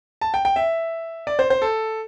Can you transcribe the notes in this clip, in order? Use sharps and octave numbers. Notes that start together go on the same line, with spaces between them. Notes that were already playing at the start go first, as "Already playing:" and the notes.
A5
G5
G5
E5
D5
C5
C5
A4